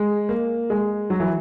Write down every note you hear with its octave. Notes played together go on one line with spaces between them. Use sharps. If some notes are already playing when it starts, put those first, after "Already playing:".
Already playing: G#3
A#3
G#3
F#3
E3